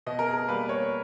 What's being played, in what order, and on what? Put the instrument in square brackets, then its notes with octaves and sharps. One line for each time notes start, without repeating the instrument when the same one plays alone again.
[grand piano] B2 D#5
A#4
G#4
G3 A#3 B4
C#5